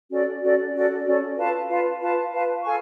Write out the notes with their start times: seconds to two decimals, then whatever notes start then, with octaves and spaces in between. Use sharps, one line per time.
0.11 C#4 F#4 A4 D5
0.42 C#4 F#4 A4 D5
0.74 C#4 F#4 A4 D5
1.06 C#4 F#4 A4 D5
1.37 F4 B4 F5 A5
1.69 F4 B4 F5 A5
2.01 F4 B4 F5 A5
2.32 F4 B4 F5 A5
2.63 A4 F5 G#5 C#6